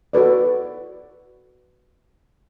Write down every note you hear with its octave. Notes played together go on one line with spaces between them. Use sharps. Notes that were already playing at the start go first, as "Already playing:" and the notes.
F#4 A4 B4 D5